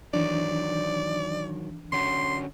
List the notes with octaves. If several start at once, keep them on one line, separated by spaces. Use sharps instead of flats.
D#3 E3 F#3 D4 D5
D3 C#4 F#4 C6